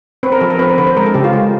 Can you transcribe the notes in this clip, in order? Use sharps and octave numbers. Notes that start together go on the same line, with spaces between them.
C4 B4
A#4
F3 A4
A#4
C4 B4
A#4
D3 B4
C5
G#3 A#4
A4
C#3 G4
F4
G#3